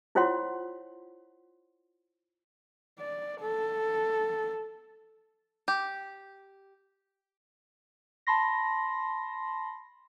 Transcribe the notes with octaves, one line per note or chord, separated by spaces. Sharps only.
E4 F4 C5 C#5 F#5 C6
D5
A4
G4
A5 B5 C6 A#6